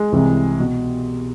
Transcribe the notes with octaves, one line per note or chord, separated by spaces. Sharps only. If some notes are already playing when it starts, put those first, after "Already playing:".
Already playing: G#3
C2 C3 E3
B2